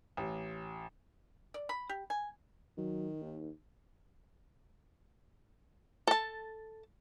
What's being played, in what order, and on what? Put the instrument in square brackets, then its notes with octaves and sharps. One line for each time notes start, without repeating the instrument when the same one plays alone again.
[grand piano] A1
[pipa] D5
B5
G4
G#5
[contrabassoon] D#3 [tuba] F#3
[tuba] D#2
[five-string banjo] A4 A5